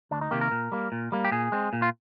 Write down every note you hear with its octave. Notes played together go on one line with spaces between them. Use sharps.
D2 D4
D#4
C3 D#3 A#3 G4
A#4
A#2
G3 A#3
A#2
G3 A#3
G4
A#2 G#4
G#3 C4
A#2
F4